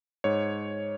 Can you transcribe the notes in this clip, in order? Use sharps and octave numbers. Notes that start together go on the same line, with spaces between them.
G#2 C#5